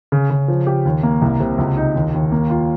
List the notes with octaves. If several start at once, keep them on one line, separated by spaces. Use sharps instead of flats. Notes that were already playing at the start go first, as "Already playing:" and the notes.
C#3
C#3
F3
G4
D#2
A#3
C2
C3
C#2
D#4
D#2
D#2
A#3
F4